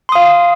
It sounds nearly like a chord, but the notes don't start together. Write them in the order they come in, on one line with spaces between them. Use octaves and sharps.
C6 D#6 F5